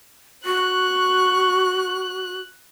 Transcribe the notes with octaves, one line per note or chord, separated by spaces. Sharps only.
F#4 C#6 F#6